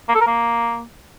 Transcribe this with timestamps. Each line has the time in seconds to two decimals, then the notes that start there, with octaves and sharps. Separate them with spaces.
0.09 A#3
0.15 A4
0.21 A#4
0.27 A#3